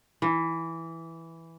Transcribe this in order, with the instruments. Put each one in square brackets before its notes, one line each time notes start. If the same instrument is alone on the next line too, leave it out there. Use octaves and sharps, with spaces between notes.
[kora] E3